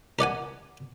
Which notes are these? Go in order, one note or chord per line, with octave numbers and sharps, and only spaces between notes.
A#4 D5 F#5 G#5